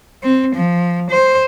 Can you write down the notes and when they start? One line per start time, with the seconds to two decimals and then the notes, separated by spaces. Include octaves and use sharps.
0.23 C4
0.55 F3
1.10 C5